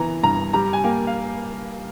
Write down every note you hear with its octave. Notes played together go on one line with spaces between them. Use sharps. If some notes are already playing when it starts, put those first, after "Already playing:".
Already playing: E3 B3 A#5
G2 A#5
G3 A#5
G#5
A#3 G5
F5